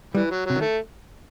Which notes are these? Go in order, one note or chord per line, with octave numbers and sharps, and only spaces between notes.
E3 G3
F#3
C3 F#3
D#3
A3